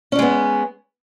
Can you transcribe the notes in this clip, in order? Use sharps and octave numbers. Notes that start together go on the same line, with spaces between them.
G#3 B3 C#4 D4